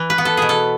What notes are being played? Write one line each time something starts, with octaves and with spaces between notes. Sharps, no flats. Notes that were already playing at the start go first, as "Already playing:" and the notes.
Already playing: E3
B4
B3
A4
B2 G#4
A4